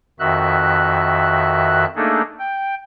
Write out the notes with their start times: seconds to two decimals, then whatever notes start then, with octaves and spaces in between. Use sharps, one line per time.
0.20 F2 D#3 F#4 E5 F#6
1.96 A3 A#3 D4 D#4 G#4 A4
2.39 G5